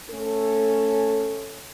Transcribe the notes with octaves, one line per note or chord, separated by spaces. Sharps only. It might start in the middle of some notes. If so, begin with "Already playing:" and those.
A3 C#4 A4